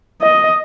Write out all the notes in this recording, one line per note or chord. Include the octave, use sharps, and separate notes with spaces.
D#5